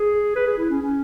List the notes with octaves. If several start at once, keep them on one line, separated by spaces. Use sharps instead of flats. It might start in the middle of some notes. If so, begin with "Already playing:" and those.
Already playing: G#4
B4
G#4
E4
C#4
C#4